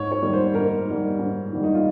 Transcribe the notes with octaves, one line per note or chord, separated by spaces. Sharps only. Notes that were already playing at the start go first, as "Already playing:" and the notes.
Already playing: G#2 C#5
C#5
D#3 G3
C5
G#2 A#4
D#3 G3
G#2
D#3 G3
D#4
F4